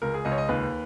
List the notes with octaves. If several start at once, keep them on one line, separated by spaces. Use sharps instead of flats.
C#2 A#4
G#4
C#2 D#5
C#5
D#5
D#2 B4